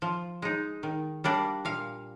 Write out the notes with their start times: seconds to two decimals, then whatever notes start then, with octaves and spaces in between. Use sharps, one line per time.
0.02 F3
0.42 G#3 D#4
0.83 D#3
1.24 G3 A#3 D4
1.65 A#2 F5